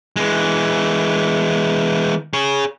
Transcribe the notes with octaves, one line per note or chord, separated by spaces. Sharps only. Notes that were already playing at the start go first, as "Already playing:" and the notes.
E3 G#3
G#4 C#5